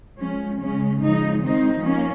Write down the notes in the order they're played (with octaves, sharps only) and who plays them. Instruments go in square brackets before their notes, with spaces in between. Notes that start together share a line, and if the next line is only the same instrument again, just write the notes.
[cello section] F3 G#3 C#4
C#3 G#3 C#4
C#3 F3 G#3 D#4
D#3 G#3 C4 D#4
F3 A#3 C#4